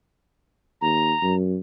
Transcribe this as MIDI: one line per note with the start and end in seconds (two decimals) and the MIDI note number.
0.81 1.12 39
0.81 1.35 82
1.23 1.58 42